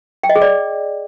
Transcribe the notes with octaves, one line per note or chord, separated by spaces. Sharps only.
G5
D#5
G#4
D5